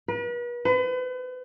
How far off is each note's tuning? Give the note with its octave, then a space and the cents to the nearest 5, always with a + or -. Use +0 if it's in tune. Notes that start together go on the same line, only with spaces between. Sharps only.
B4 -40
B4 +40